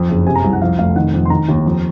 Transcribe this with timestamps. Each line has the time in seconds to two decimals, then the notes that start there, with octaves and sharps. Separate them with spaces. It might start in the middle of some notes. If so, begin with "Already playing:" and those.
Already playing: F2
0.09 F#1
0.26 C3 G#5
0.35 A#5
0.44 C2
0.53 F#5
0.62 F2 F5
0.78 F1 F5
0.96 D#3 F#5
1.14 F2
1.25 C6
1.30 D#3 A#5
1.48 D#2
1.66 F2